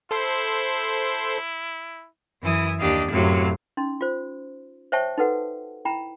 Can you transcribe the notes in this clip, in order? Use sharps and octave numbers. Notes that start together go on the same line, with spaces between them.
E4 A4 C5 C6
F#2 E3 E4 G#5 D#6
D#2 D4 G4 D#5 F5
F#2 A2 C3 F#3 F5
C#4 D#4 C6
F4 C5
C5 C#5 E5 G5 A5 C#6
D#4 F#4 A4 B4 F#5
E4 G5 A#5 B5